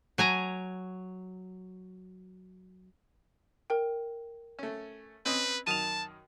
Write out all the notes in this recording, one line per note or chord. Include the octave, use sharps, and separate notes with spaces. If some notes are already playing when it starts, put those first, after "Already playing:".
F#3 G#5 A#5
A#4 G5
A3 C#4
C4 C#4 B4 D#5
F#2 D#3 A5 D#6 D#7 F7